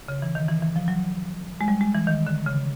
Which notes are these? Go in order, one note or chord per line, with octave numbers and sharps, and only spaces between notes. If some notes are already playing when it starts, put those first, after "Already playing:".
C#3
E3
D#3
E3
E3
F3
F#3
G#3
G3
G#3
E3
D#3
D3
C#3